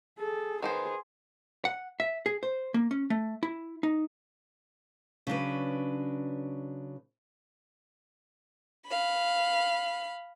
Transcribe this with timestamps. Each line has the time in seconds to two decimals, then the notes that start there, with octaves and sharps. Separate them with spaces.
0.19 G#4 A4
0.62 D#3 B3 G#4 C5 C6
1.65 F#5
2.00 E5
2.26 G#4
2.43 C5
2.74 A#3
2.91 C#4
3.10 A3
3.43 E4
3.83 D#4
5.27 C#3 F#3 D4 B4
8.87 F5 B5